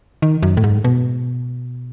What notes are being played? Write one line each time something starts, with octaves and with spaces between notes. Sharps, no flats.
D#3
F#2
A2
G#2
B2